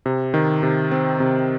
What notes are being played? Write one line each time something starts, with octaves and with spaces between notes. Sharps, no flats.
C3
D#3
C3
C4
C3